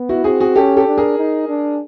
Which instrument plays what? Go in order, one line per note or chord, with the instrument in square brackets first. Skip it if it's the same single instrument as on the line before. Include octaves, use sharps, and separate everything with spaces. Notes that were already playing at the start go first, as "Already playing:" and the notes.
Already playing: [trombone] B3
[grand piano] E4 F#4
[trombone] C4 [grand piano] F#4 G#4
[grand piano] F#4 G#4
[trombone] C#4 [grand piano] G4 A4
[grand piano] G4 A4
[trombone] D4
[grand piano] G#4 A#4
[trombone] D#4
D4